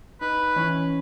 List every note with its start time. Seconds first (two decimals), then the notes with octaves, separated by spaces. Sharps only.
0.21 D#4 B4
0.56 E3 C#4